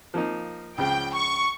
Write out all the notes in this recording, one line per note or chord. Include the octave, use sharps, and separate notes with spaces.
F3 A#3 D#4
C#2 C#3 F3 G5
C#6